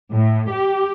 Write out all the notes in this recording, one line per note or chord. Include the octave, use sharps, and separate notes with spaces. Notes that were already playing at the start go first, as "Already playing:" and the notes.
A2
G4